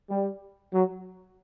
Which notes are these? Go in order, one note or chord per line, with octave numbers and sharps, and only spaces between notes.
G3
F#3